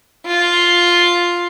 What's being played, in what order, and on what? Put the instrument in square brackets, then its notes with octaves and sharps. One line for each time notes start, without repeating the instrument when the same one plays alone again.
[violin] F4